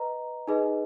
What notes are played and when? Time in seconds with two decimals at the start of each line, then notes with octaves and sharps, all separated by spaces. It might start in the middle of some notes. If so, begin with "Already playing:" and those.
Already playing: B4 D#5 A#5
0.48 D#4 G#4 B4 D#5